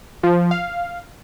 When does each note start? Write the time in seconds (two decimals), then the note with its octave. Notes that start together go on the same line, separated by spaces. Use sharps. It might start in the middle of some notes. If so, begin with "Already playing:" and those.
0.23 F3
0.51 F5